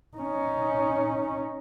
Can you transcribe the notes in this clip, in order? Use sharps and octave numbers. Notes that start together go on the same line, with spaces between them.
C#4 D#4